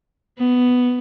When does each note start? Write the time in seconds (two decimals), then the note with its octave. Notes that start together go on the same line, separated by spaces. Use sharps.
0.39 B3